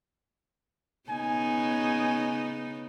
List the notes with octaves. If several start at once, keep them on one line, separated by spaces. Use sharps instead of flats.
C#3 B3 D#4 G#5